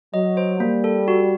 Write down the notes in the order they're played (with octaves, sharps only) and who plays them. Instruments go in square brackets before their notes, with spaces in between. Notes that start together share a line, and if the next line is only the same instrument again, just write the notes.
[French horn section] F#3 [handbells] D#5
[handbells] C5
[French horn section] G3 [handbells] A#3
[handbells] A4
F#4